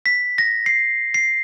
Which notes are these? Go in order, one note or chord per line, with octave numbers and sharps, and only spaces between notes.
B6
A#6
C7
C7